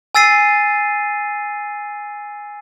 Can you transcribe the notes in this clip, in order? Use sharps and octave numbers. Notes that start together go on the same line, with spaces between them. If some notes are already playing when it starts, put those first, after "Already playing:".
G#5 E6 A6 C7 D#7